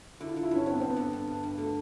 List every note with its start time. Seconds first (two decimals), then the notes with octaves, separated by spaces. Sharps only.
0.20 D3 E4
0.32 D3 F4
0.43 E4
0.51 G2 C#4
0.66 G2 C4
0.73 B3
0.80 G2 C4
0.90 B3
0.96 D3
1.13 G2
1.27 G2
1.44 G2
1.58 D3 A3